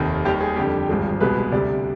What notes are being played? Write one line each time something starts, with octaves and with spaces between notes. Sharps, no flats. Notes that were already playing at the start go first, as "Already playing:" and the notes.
Already playing: F1 D#2 D#3
D#2 D#3 G3 G4
G#4
F2 D3 G3 G4
G#1 G2 F3 G#3
C2 B2 G#3 B4
D2 C3 G3 D5